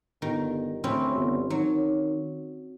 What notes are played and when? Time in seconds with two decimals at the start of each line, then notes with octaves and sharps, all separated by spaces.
0.22 G1 D#3
0.84 D2 C4 C#4 E4
1.15 G1
1.50 D#3 F#3